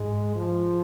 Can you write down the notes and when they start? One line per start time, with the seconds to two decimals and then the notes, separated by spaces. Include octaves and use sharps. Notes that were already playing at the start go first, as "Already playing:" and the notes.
Already playing: G#2 G#3
0.36 F3